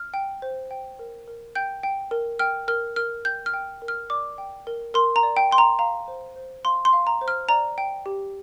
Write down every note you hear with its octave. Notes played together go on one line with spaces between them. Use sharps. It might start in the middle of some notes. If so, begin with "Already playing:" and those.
Already playing: F6
G5
C5
G5
A#4
A#4
G5 G6
G5
A#4
G5 F6
A#4 F6
A#4 F6
G5 G6
F6
G5
A#4
F6
D5 D6
G5
A#4
A#4 C6
A#5
D5
G5
G5 C6
A#5
F5 A#5
C5
C5
F5 C6
C6
F5
A#5
C5
F6
D5 A#5
G5
G4